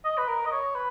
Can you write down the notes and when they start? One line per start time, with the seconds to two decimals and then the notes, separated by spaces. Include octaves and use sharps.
0.04 D#5
0.17 B4
0.28 A#4
0.46 D#5
0.52 C#5
0.75 B4